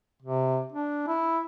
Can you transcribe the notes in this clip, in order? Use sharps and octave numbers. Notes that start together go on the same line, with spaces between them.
C3
D4
E4